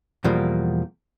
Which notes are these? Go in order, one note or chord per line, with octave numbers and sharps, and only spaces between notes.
E2 B2 F3 G3 A#3